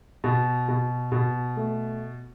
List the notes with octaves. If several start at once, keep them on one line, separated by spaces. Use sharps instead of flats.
B2
B2
B2
A3